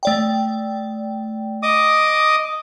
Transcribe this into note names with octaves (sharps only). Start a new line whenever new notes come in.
A3 D5 G5
D#5 D6 D#6